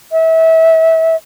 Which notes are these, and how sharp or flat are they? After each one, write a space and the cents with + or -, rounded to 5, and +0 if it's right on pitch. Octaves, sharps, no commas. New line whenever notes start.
E5 -30